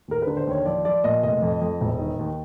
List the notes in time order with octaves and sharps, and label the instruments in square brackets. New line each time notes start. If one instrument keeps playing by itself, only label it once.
[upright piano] D#2 A#4
D3 B4
C5
D#2 C#5
F3 D5
F3 D5
A#2 D#5
F1 D#5
F2
F2
E1
D#3
D#2